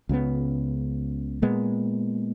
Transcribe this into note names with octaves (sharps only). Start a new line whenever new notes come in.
C#2 C#3 F#3 B3
A#2 G#3 B3